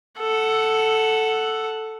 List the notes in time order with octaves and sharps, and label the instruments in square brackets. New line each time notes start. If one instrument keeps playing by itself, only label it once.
[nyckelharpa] A4 F#5